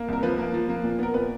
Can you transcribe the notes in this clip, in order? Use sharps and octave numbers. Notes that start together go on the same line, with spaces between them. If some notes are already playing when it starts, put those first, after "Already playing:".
Already playing: A#3
C2 A#4
F3 B4
A#3
F3
A#3
A#2
B3 A#4
A#2 B4